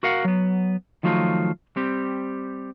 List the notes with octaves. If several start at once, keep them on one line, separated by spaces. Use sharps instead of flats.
F#4 A#4 F5 F#5
F#3 B3
D#3 F3 F#3 A3 F4
G3 C4 G4